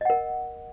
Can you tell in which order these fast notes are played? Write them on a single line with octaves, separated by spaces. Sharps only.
D#5 F#5 A#4